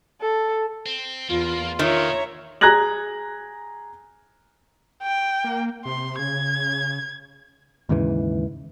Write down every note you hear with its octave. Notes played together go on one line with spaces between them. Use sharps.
A4
C4
E2 A#3 F4
A#2 D#3 B3 C#5 E5 A#5
G#4 A#5 F#6 G#6 A#6 F#7
G5
A#3
C3 C6
C#3 G#6
D#2 G#2 C#3 E3